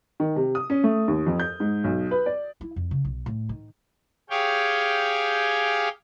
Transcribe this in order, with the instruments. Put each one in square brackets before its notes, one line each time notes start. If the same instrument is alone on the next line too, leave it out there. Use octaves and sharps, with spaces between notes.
[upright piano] D#3
C3
D#6
C#4
A3
D#2
F2
G6
G#2
B1
B4
D5
[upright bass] E4
F2
C#3
B1
A2
D#3
[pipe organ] G4 G#4 C#5 F5 G5